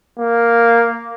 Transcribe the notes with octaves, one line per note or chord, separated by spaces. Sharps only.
A#3